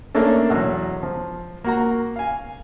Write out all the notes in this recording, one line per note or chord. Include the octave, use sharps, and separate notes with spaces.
A3 A#3 C#4 D4 A4
E2 B2 F#3
F3
A#3 F#4 A#5
F5 G#5